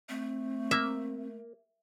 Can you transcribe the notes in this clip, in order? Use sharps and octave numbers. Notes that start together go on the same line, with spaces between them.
A3 C4
A#3 E5